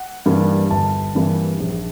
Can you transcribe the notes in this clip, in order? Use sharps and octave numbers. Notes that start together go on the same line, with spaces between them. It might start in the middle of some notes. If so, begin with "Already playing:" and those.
Already playing: F#5
G2 E3 G3 A#3
G1 A5
G2 E3 G3 A#3
A#1